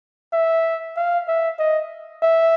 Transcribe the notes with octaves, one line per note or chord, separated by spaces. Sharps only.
E5
F5
E5
D#5
E5